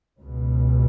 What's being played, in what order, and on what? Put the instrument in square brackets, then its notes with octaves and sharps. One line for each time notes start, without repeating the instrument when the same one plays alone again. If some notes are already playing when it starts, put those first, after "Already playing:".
[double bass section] C#2 B2